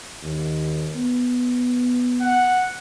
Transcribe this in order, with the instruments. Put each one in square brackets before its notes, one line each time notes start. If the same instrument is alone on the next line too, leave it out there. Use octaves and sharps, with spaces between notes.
[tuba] D#2
B3
[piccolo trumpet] F#5